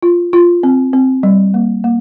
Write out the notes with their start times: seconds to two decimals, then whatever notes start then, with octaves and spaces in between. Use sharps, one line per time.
0.03 F4
0.33 F4
0.63 C4
0.93 C4
1.23 G3
1.54 A#3
1.84 A#3